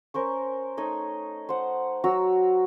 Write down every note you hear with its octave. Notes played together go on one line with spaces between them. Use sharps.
C#4 A#4 C5 C#6
A3 D#4 C#5 D#5
C5 F#5
F#3 F#4 A#5 E6